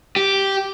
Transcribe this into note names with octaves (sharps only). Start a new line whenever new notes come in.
G4